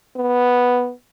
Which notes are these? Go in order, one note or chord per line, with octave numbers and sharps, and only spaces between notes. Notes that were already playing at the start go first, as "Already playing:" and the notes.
B3